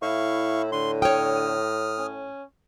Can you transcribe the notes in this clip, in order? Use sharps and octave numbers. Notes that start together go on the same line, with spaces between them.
A2 E4 F5 C#6
D3 C6
C#5 G5 D#6 F6
C#4